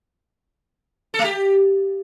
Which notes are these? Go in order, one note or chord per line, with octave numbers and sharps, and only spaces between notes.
A4
A3
G4